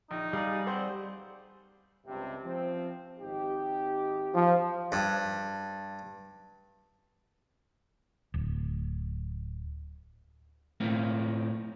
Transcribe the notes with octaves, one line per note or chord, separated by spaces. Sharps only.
A#1 D#4
G3 G#4 D5 F5 A#5
C4 C5 F#5 B5
C#2 G2 C3
F3 C4
G#1 D#4 G4
F3
G2
D1
A2 A#3 C4